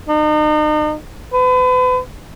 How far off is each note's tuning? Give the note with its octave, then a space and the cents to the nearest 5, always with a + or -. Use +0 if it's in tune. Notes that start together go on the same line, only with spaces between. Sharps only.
D#4 -40
B4 +40